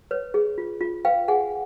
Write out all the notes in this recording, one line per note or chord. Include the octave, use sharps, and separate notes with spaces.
B4 C#5
G#4
F4
F4
B4 F5 G5
G#4 F#5 G#5